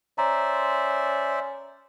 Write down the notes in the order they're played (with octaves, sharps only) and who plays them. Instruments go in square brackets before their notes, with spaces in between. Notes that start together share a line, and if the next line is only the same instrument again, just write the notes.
[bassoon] C#4 [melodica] C5 D5 E5 [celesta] A#5